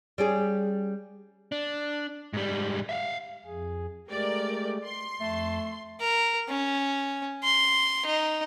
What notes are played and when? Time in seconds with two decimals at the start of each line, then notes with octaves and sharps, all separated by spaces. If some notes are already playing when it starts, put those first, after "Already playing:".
0.18 G3 C#4 G#4
1.52 D4
2.33 G#2 G3
2.89 E5 F5
3.46 F2 G#4
4.09 G#3 A3 G4 A#4 D5
4.85 C6
5.21 F2 A3 A5
6.01 A#4
6.49 C#4
7.44 C6
8.06 D#4